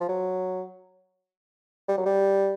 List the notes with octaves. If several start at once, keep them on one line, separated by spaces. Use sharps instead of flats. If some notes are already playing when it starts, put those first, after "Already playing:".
F3
F#3
G3
F#3
G3